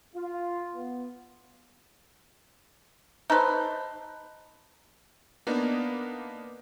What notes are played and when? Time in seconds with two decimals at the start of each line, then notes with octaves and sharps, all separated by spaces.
0.16 F4
0.75 B3
3.30 D#4 A4 B4 C5
5.47 A#3 B3 D4 D#4